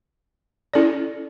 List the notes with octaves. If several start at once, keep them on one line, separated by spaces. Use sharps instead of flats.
C#4 E4 A4 D5